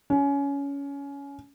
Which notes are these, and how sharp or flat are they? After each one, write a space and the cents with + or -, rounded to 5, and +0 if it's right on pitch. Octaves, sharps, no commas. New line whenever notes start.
C#4 +20